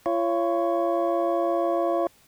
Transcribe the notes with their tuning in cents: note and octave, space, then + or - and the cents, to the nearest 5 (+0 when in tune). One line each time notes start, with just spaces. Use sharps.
F4 -40 C#5 +0